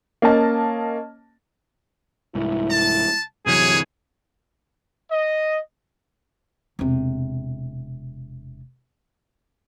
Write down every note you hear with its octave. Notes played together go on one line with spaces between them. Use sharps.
A#3 C#4 D#5 A5
C2 G#2 E4
A5
G1 C3 E3 F#3 G#4 B4 C#5
D#5
E1 C3